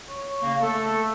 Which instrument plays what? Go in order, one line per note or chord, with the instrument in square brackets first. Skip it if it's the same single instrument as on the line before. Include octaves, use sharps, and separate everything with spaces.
[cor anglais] C#5
[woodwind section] C#3 A#3
[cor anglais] A3 [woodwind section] A4